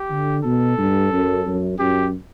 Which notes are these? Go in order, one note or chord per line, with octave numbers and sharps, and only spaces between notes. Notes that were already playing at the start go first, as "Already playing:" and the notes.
Already playing: G4
D3
B2 A4
G2
F#2
F#2
F#2 G4